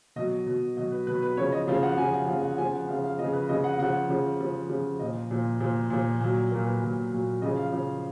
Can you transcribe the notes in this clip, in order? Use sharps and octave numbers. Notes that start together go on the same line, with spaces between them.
B2 F#3 D#5
B2 F#3
B2 F#3 D#5
B4
B2 F#3 B4
B4
C#3 F3 C#5
D#5
C#3 F3 F5
F#5
C#3 F3 G#5
F#5
C#3 F3 F5
F#5
C#3 F3 G#5
F#5
C#3 F3 F5
F5
C#3 F3 D#5
B4
C#3 F3 D#5
F#5
C#3 F3 F#5
C#3 F3
C#3 F3
C#3 F3
A#2 F3 D#5
A#2 F3
A#2 F3
A#2 F3
A#2 F#3
A#2 F#3 A#4
B4
A#2 F#3
A#2 F#3
C#3 F3 D#5
F5
C#3 F3